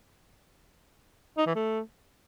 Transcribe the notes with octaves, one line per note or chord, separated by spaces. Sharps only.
D#4
E3
A3